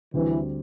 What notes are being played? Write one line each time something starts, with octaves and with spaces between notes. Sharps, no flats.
D2 D3 E3 G3 C4